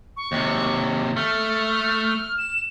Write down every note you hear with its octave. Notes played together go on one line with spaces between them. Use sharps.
C#6
D#2 C3
A3 F6
E7